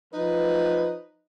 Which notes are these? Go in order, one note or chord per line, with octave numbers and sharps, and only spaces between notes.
F3 D#4 B4